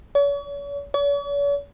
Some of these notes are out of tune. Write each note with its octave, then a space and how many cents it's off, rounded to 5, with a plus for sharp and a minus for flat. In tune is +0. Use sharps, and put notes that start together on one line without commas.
C#5 +40
C#5 +45